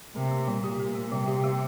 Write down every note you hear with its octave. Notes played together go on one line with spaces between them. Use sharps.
C3 A#4
A#3
A#2 G3
G4
A#4
A#3
C3 G3
G4
A#3